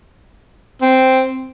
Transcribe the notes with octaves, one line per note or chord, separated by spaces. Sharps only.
C4